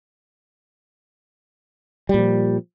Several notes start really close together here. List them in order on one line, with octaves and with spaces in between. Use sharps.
G3 A#2 F3